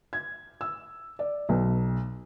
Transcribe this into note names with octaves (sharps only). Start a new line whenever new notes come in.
G#6
E6
D5
B1